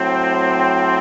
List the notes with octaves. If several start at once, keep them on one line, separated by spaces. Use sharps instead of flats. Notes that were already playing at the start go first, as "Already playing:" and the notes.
Already playing: A2 F#3 C4